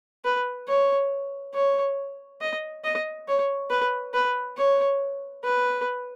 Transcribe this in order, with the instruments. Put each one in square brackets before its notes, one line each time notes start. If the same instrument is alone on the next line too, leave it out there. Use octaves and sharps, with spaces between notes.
[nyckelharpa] B4
C#5
C#5
D#5
D#5
C#5
B4
B4
C#5
B4